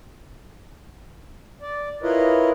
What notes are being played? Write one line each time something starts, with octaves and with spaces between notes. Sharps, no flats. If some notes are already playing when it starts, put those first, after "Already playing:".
D5
E4 F4 A#4 B4 C#5 D#5